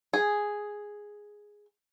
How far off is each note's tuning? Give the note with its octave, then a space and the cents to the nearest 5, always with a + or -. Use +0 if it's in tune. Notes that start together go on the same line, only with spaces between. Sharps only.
G#4 +0 G#5 +0